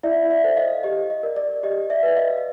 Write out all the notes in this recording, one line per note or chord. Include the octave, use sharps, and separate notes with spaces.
E4 D5 E5
D5 E5
A4 C5
D#5 F5
G4 D#5
D#5
A#4 D5
D5
G4 D#5
D5 E5
B4 D5
D#5 F5